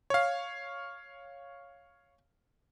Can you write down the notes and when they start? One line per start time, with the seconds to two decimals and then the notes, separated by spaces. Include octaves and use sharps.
0.10 C#5 F5